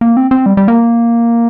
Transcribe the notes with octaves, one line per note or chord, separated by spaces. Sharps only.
A#3
C4
C4
G3
G3
A#3